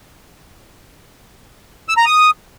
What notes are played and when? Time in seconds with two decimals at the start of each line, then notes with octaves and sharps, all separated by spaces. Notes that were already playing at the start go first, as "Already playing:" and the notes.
1.89 E6
1.97 A#5
2.06 D#6